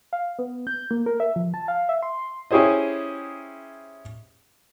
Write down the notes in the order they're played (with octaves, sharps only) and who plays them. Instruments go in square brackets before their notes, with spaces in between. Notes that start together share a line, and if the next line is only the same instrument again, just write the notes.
[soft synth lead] F5
B3
G6
A#3
A#4
E5
F3
A5
F5
E5
C6
[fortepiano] C#4 E4 G4 G#4 C5 D#5